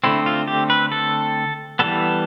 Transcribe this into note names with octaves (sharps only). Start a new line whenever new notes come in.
D3 A3 C4 E4
F4
G4
B4
A4
E3 G3 B3 A4